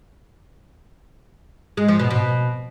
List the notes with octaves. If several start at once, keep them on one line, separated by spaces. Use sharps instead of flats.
G#3
F3
B2
B2